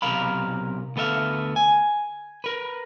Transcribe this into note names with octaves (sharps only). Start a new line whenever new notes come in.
B1 C3 A#4 F5 B5
D2 B3 A4 E5 F5
G#5
A#4 B4